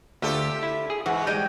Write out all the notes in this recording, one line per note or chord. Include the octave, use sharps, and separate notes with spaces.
D2 F4 G4 A4 E5
E4
G#4
G#2 E3 F#4
G3 G#3 D#5 G5